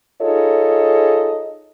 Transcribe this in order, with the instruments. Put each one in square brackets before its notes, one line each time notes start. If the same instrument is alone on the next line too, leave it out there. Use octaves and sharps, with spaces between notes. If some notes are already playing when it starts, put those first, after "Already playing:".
[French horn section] D#4 F4 G#4 A4 C#5 D#5